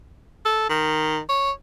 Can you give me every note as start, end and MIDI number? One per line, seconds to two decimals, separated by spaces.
0.45 0.65 69
0.70 1.20 51
1.29 1.51 73